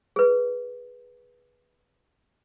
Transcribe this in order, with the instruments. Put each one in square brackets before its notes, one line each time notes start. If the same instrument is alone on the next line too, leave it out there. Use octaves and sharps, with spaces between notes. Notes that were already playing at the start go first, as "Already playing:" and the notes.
[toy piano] G#4 B4